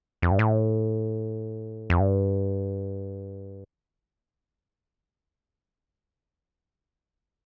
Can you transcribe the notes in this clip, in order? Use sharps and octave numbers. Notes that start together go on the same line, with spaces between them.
F2
G2
A2
F2
G2